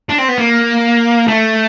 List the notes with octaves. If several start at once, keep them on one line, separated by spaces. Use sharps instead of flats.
D4
C4
B3
A#3
A3